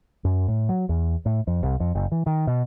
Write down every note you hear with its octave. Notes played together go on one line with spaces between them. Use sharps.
F#2
A2
F#3
E2
A2
F2
C2
F2
F#1
E3
D#3
B2